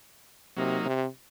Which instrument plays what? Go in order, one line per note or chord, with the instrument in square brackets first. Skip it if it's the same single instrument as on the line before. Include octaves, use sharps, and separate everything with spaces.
[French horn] C3 [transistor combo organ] F#3 A#3 D#4
[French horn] C3